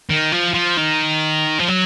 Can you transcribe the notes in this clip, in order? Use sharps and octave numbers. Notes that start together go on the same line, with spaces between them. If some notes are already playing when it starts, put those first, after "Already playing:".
D#3
F3
F3
D#3
F3
F#3